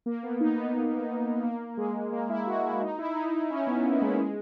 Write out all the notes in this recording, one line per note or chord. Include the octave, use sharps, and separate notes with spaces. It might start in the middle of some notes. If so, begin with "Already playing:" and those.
A#3
B3
D#4
B3
A#3
G#3
A#3
E4
F#4
E4
D#4
E4
D#4
D#4
C#4
B3
A#3
G#3
G#3